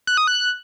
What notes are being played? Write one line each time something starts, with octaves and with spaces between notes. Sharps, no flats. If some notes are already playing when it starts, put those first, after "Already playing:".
F#6
D#6
F#6